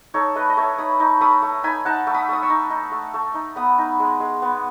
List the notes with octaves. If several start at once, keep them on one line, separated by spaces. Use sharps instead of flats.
D#4 A4 C#5
A3 B4 D#5
D#5
A3 C#5 E5
D#4 B5 D#6
D#4
A3 B5 D#6
A3
D#4 G#5 B5
D#4 F#5 A5
A3
B5 D#6
A3 D#6
C#6 E6
D#4
D#4
A3
A3
D#4
B3 B5 D#6
D#4
G#3
G#3
B3